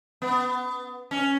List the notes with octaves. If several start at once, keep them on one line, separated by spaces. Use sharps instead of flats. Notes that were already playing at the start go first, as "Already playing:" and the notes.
B3
C#4